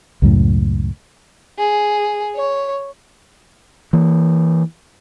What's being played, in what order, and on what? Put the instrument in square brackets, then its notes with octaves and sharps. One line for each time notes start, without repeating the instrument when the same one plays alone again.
[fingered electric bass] C#2 F#2 A2
[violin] G#4
C#5
[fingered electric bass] E3 A#3